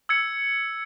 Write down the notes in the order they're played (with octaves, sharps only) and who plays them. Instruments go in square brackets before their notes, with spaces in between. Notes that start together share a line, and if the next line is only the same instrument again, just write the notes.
[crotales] E6 G#6 C#7